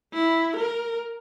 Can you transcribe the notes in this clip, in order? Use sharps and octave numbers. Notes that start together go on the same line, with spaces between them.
E4
A#4